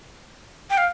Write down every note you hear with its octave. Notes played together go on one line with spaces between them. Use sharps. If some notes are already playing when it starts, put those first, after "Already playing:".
G5
F5